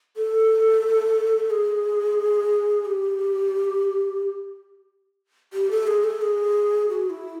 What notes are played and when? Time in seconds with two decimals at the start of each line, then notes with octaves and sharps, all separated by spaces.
0.17 A4
1.50 G#4
2.85 G4
5.53 G4
5.71 A4
5.87 G#4
6.04 A4
6.22 G#4
6.89 F#4
7.10 E4